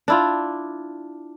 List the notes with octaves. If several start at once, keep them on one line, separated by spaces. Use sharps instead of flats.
D4 E4 F4